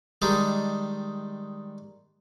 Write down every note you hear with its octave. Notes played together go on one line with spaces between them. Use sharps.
D#3 G3 G#3 D4